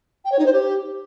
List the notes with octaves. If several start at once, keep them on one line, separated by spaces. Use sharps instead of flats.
G5
C#5
D#4
C5
G4